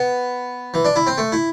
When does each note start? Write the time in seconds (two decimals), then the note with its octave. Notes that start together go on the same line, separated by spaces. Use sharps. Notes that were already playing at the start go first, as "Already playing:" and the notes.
Already playing: B3
0.74 E3
0.85 D4
0.96 E4
1.07 C4
1.18 A3
1.32 E4